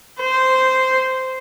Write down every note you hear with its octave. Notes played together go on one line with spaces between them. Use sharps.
C5